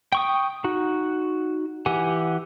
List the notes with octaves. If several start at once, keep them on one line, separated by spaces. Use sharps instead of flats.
G5 C#6 D#6
D#4 F#4
E3 G4 F#5 G#5